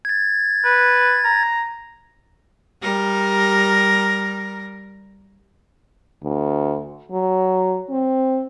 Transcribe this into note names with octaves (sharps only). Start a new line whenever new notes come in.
G#6 A6
B4
A#5
G3 A#4
D2
F#3
C4